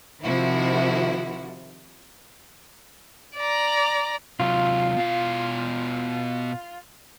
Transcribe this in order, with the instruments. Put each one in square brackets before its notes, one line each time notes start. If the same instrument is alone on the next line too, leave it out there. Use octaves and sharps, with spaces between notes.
[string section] C3 D#3 F3 E4 F#4
[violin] D5 A#5
[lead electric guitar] C3 F#3 [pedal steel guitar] F4
[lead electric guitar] B2 F5